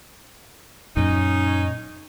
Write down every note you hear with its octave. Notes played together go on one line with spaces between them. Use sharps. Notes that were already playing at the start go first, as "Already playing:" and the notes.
F#2 A#2 C#4 D#4